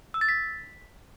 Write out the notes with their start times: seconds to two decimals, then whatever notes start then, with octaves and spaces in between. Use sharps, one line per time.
0.14 E6
0.21 A6
0.29 B6